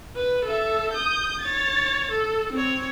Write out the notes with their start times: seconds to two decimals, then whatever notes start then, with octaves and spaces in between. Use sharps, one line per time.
0.16 B4
0.45 A4 E5
0.93 D#6 G6
1.41 C#5 A6
2.12 A4
2.53 C4 C#5